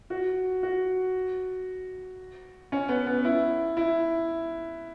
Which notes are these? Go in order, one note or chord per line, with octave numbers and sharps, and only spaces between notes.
F#4
F#4
C#4
B3
B3
E4
E4